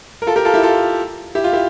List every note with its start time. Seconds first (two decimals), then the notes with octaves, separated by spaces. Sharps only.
0.22 A#4
0.27 F4 A4
0.36 G4 A#4
0.45 F4 A4
0.54 E4 G4
0.63 F4 A4
1.35 E4 G4
1.44 F4
1.53 E4 G4